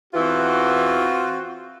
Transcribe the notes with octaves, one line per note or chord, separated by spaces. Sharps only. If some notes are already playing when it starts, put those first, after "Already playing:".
E2 E3 C4 F4 F#4